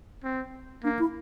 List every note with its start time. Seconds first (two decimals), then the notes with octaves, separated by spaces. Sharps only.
0.24 C4
0.83 A#3 D4
0.99 E4